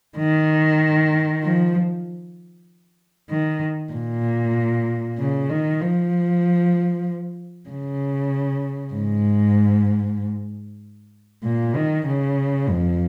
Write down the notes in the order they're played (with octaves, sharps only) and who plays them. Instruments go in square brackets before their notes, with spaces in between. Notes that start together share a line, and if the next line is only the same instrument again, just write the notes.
[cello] D#3
F3
D#3
A#2
C#3
D#3
F3
C#3
G#2
A#2
D#3
C#3
F2